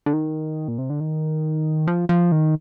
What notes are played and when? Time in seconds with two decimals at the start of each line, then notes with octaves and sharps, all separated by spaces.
0.06 D3
0.13 D#3
0.68 A#2
0.78 C3
0.90 D3
1.00 D#3
1.87 F3
2.09 F3
2.32 D#3